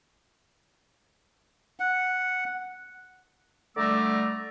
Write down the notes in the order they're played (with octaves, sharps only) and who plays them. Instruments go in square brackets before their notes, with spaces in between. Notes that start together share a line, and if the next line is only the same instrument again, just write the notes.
[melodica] F#5
[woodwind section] D3 G3 A3 A#5 D6 E6